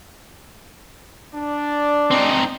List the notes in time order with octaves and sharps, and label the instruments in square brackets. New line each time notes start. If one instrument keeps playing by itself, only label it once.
[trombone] D4 [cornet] D5
[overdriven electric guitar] C4 D#4